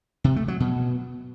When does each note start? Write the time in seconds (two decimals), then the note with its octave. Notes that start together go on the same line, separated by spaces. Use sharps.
0.24 C3
0.36 A3
0.48 F#3
0.60 B2